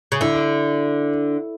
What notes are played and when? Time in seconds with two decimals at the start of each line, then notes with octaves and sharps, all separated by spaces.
0.12 C#3
0.20 D3 E4